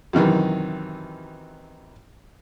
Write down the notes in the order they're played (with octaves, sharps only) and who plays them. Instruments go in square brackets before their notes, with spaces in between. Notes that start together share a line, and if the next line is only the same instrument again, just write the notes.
[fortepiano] F#2 C3 D#3 E3